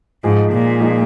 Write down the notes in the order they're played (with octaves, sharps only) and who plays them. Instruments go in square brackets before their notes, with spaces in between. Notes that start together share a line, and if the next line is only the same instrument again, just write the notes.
[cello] G#2 [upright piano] F3 G#3 D#4 G#4
[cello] A#2
[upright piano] F3 G#3 D#4 G#4